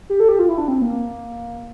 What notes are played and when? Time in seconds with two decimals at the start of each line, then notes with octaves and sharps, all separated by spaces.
0.10 G4
0.20 A4
0.28 G4
0.39 F4
0.49 E4
0.58 D4
0.68 C4
0.82 A#3